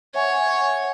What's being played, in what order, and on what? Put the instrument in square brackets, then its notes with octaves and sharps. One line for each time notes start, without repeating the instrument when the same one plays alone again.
[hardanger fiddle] C#5 [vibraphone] E5 F#5 G#5